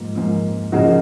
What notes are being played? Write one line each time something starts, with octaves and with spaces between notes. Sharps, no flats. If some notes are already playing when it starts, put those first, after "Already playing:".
Already playing: G#2 F3 A#3
G#2 F3 A#3
C#3 F3 A#3 D#4 F#4